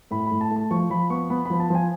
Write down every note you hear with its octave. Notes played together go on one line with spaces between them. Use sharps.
A2 B5
B5
A2
A5
A3 A5
F3 C#6
F3 B5
B3 C#6
B3 B5
F3 B5
A5
F3 G#5